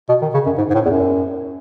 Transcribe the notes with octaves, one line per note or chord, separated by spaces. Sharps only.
B2
D#3
C#3
F#2
G#2
G#2
A2
E2
F#2